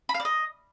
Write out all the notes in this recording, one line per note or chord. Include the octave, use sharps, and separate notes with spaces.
B5
F5
D5
D#5